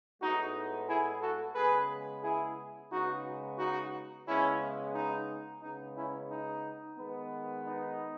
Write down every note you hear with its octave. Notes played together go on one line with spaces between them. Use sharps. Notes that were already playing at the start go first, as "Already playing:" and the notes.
A2 G#3 B3 D#4 F#4
E4 G#4
F#4 A4
C#3 G#3 B3 G#4 B4
E4 G#4
C#3 G#3 B3 D#4 F#4
D#4 F#4
C#3 G#3 B3 C#4 E4
D#4
C#3 G#3 B3 D#4
C#4 E4
D#4
D#3 G#3 B3
D#4